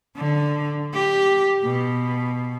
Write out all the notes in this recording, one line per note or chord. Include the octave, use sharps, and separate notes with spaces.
D3
G4
B2